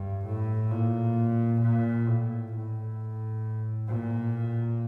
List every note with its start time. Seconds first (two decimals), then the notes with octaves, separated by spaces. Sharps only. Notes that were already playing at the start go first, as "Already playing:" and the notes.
Already playing: G2
0.26 A2
0.71 A#2
1.62 A#2
2.07 A2
2.53 A2
3.88 A#2